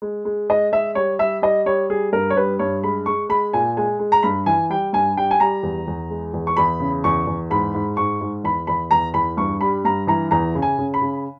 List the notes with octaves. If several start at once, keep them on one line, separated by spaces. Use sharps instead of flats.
G#3
G#3
G#3 D#5
G#3 E5
G3 C#5
G3 E5
G3 D#5
G3 C#5
G3 G#4
G2 A#4
C#5
G3 B4
G2 C#5
G#3 B5
G#3 C#6
G#3 B5
A#2 G#5
G#3 G#5
G#3
A#5
G2 B5
E3 G#5
G3 G5
G2 G#5
G3 G5
G#5
G3 A#5
E2
E2
G#3
E2
C#6
E2 B5
C#3
E2 C#6
E2
G#2 B5
G#2
G#2 C#6
G#2
E2 B5
E2 B5
E2 A#5
E2 B5
G2 C#6
G3 B5
G2 A#5
E3 A#5
E2 A#5
C#3
G#5
C#3
B5
C#3